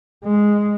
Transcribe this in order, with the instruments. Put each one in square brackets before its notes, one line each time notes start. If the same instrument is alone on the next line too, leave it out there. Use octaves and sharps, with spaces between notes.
[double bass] G#3